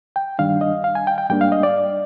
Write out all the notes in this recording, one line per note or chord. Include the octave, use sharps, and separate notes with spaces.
G5
G2 D#3 G3 D4 F5
D#5
F5
G#5
G5
G5
G#2 G3 A#3 D4 G5
F5
D#5
D5